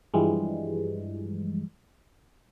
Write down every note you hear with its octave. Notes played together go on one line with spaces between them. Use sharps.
G2 E3 F3 G3 G#3